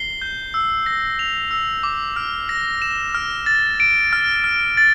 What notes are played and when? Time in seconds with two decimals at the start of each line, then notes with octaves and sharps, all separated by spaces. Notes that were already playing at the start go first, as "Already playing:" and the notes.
Already playing: C7 G7
0.21 G6
0.54 E6
0.86 A#6
1.19 F7
1.51 E6
1.83 D6
2.16 F6
2.49 A#6
2.82 E7
3.15 F6
3.46 A6
3.80 D7
4.13 F6
4.44 F6
4.77 A6